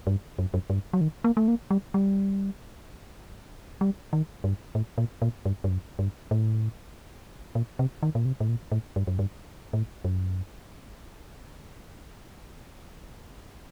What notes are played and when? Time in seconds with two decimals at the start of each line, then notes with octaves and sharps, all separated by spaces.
0.07 G2
0.39 F#2
0.54 F#2
0.70 G2
0.93 F#3
1.01 D#3
1.24 A#3
1.37 A3
1.48 A#3
1.71 G3
1.94 G3
3.81 G3
4.13 D#3
4.44 G2
4.75 A2
4.98 A#2
5.22 A#2
5.46 G2
5.64 G2
5.68 F#2
5.99 G2
6.31 A2
7.55 A#2
7.79 C3
8.03 D#3
8.15 A#2
8.25 C3
8.40 A2
8.49 A#2
8.72 A2
8.96 G2
9.07 F#2
9.19 G2
9.73 A2
10.05 F#2